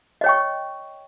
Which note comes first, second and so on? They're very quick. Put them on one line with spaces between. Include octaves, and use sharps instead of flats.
D#5 C#5 G5 C#6